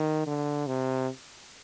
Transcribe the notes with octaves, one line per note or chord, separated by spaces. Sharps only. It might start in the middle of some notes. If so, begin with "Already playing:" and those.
Already playing: D#3
D3
C3